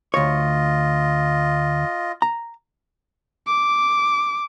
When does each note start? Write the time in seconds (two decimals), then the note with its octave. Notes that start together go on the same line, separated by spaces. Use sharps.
0.14 D2 F4 C#5 D#5
2.22 A#5
3.47 D6